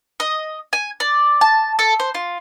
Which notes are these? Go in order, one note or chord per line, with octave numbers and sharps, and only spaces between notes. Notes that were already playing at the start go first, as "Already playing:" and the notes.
D#5
G#5
D5
A5
A4
C5
F4